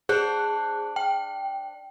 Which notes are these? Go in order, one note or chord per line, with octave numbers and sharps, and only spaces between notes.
D4 G#4 C5 F#6
G5